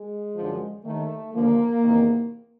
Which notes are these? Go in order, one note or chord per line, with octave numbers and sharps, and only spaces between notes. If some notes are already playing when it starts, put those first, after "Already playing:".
Already playing: G#3
F#2 D3 F3
D#2 D#3 A3
D#2 D3 F3 A#3
E2 C3 D#3